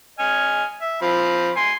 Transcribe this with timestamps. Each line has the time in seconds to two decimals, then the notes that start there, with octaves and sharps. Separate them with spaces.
0.19 D#5 G#5 F6
0.81 E5
1.02 F3 C4 B5
1.56 G#5 C6